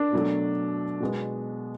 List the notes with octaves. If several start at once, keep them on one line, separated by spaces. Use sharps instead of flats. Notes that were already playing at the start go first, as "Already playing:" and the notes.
Already playing: D4
B2 F#3 A3
B2 G#3 B3